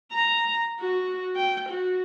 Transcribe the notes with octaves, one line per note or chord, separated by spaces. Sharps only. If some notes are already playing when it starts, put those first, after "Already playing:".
A#5
F#4
G5
F#4